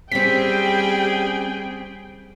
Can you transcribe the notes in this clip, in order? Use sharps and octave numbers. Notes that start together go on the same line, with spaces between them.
G3 C4 C#4 G#4 G5 B6